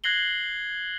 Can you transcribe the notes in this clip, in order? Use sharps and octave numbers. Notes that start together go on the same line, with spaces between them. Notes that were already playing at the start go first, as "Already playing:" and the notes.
F#6 G#6 A#6 C7 F#7 G7